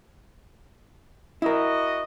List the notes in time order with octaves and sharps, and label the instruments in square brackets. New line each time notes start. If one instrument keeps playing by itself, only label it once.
[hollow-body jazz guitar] E4 A#4 [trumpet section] F#4 D#5